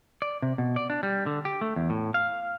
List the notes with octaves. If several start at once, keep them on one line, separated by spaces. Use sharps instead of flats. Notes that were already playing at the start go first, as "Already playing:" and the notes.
D5
C3
B2
D5
D4
G3
D3
G4
A3
E2
A2
F5